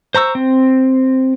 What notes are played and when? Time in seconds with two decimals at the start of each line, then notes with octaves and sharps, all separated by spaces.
0.14 C5 A#5 C#6 E6
0.35 C4